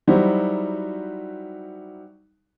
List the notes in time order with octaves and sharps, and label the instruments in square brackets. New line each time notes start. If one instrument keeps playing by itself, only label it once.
[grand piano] F#3 G3 D#4 E4 F#4 C5